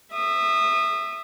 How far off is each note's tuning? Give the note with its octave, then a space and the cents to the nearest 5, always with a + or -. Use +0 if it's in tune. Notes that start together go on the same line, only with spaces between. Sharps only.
E5 +0 D#6 -25